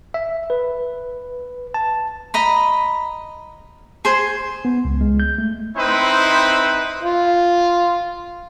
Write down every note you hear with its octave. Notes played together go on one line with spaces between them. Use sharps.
E5
B4
A5
D#5 A#5 B5
G#4 C5
B3
C#2
G#3
G6
A3
C4 D#4 E4 B4 C5
F4